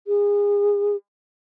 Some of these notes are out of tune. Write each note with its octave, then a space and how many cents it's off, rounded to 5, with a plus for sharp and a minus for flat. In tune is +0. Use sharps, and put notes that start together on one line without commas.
G#4 -30